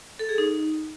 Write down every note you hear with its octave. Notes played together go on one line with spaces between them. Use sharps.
A4
G#4
D#4